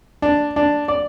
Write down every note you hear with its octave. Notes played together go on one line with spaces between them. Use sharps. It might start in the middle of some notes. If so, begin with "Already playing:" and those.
D4
D4
D5